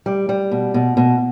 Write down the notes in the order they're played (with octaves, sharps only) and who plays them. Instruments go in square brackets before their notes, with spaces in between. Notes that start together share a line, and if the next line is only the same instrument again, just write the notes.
[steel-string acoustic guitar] G3
G3
B2
B2
B2